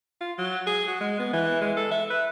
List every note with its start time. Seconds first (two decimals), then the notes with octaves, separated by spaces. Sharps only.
0.21 F4
0.38 F#3
0.67 G#4
0.88 F#4
1.01 G#3
1.19 B3
1.33 E3
1.61 G#3
1.77 A4
1.92 E5
2.10 B4